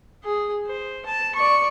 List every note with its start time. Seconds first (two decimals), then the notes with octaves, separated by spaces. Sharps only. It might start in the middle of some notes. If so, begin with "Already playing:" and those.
0.24 G#4
0.67 C5
1.06 A5
1.35 D5 C#6